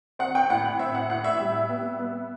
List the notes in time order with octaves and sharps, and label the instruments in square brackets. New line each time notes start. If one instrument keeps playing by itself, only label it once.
[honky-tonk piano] C4 F#5
G5
A2 F#5
F#5
C4 E5
F#5
A2 F#5
E5
G3
B3
B3